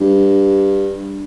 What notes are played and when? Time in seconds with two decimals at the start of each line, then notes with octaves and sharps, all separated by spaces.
0.01 G2